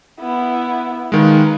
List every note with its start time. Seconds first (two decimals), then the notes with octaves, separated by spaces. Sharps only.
0.20 B3 E4
1.12 D#3 G#3 A#3 B4